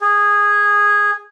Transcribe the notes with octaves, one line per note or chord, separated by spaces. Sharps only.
G#4